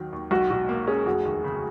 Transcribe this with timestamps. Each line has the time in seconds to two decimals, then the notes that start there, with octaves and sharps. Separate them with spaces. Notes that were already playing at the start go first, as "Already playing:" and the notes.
Already playing: D#2 D#3 F#3
0.13 D#2
0.31 B1 F#4
0.50 B2 F#4
0.69 A#3
0.87 C#4 G#4
1.06 F1 F#4
1.25 D#2
1.44 C#3